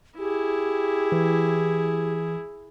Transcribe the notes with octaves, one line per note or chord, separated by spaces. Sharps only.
E4 G4 G#4
E3